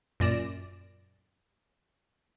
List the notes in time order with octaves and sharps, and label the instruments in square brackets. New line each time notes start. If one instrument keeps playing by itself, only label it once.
[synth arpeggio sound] F#2 A#2 D5 A#6 D7 E7